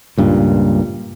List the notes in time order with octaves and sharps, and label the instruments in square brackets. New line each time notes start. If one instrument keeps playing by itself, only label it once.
[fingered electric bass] C#2 G2 A#2